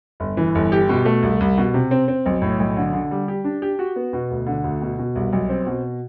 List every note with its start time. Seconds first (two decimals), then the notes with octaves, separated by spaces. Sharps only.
0.20 G1
0.37 E3
0.55 G1
0.72 G4
0.89 B2
1.05 A3
1.23 C2
1.40 C2
1.58 B2
1.74 C3
1.91 C4
2.08 C4
2.26 B1
2.42 A2
2.60 B1
2.76 D3
2.93 D3
3.11 G3
3.28 G4
3.44 D4
3.62 G4
3.79 F#4
3.96 B3
4.13 B2
4.30 D2
4.46 D3
4.64 D2
4.81 B2
4.98 B2
5.15 C2
5.33 B1
5.49 C4
5.66 B2